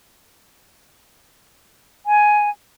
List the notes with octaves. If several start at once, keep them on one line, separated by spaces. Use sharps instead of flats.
G#5